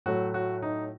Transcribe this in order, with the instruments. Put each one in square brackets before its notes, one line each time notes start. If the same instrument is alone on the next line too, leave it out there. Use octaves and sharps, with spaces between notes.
[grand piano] A2 F#3 A3 F#4
F#4
D#4